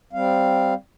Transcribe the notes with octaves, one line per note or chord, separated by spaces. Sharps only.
G3 C4 F5